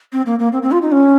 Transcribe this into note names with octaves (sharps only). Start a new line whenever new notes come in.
C4
A#3
A#3
C4
C4
F4
D#4
C#4